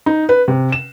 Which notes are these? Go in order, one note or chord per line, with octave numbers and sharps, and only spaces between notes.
D#4
B4
C3
E7